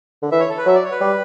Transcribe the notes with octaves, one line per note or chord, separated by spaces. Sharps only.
D3
E3 E5
C#5
A4
B4
F#3 E5
D5
C#5
B4
G3